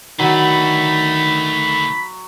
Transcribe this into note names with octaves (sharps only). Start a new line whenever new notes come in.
D3 D#3 F#3 A3 B5